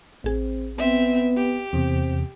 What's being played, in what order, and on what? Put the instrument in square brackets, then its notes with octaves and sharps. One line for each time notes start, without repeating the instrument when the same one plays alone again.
[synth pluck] A1 G#4 [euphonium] C4
[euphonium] B3 [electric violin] C4 E5
[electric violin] G4
[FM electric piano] E2 C3 [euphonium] C4